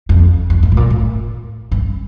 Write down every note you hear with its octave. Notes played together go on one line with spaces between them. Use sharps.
F2
F2
G2
A2
A#2
A2
G2